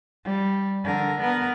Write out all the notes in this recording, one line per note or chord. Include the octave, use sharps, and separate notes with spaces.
G3
D3 A#4
B3 A#4